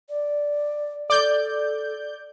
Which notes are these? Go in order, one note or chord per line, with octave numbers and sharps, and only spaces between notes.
D5
A4 D5 G6